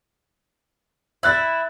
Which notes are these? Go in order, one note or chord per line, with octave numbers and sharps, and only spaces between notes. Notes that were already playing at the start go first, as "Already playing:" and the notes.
E4 E6 F#6 A6